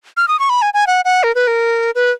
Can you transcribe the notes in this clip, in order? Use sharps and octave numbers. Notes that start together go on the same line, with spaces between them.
F6
D#6
C#6
B5
G#5
G#5
F#5
F#5
A#4
B4
A#4
B4